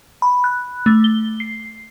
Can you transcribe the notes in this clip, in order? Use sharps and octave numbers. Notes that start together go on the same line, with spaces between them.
B5
F#6
A3
G7
C7